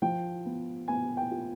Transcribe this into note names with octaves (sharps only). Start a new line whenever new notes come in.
F3 G5
B3
B3 G#5
G5
F4